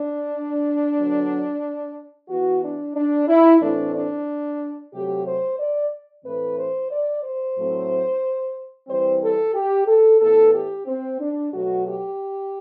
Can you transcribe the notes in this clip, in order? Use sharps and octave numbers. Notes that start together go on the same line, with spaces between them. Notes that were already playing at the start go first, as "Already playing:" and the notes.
Already playing: D4
D3 F#3 B3
E3 B3 F#4
D4
D4
E4
A2 E3 A3 C4 D4
D4
C3 F#3 A3 G4
C5
D5
A2 E3 A3 C4 B4
C5
D5
C5
A2 F#3 A3 C4
E3 G3 C4 C5
A4
G4
A4
A2 E3 B3 A4
G4
C4
D4
B2 F#3 A3 F#4
G4